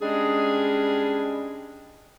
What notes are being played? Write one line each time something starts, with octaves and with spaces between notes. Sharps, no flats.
G3 G#3 C#4 D4 G#4